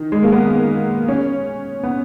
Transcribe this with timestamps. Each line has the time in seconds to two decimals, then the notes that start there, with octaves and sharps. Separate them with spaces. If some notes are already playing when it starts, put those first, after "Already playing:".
Already playing: D#3
0.12 G#3
0.23 A#3
0.32 B3
1.08 C#4
1.83 B3